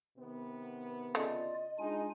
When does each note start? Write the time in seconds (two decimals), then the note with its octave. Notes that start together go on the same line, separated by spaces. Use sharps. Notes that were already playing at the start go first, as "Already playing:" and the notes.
0.17 C3 D#3 B3
1.15 C#3 A3 F4 D5 D#5
1.78 G#3 D4 D#4 F4 G#5